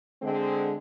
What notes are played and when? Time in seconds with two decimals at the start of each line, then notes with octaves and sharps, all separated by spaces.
0.22 D3 G#3 C4